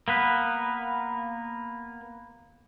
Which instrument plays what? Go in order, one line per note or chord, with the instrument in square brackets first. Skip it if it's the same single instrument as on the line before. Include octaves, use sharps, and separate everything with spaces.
[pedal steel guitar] A#3 B3 B4